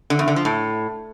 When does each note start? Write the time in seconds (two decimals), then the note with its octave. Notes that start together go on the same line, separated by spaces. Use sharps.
0.10 D3
0.19 E2
0.28 D3
0.36 F3
0.45 A2